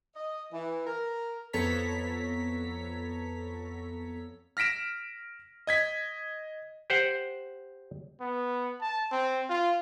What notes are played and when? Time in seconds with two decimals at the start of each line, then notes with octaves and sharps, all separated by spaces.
0.16 D#5
0.53 E3
0.87 A#4
1.53 F2 B3 A4 C#5 A#5 B6
4.57 F6 A#6 B6 D7 E7
5.67 D#5 G#6 B6
6.90 G4 C5 F#5
8.20 B3
8.81 A5
9.12 C4
9.49 F4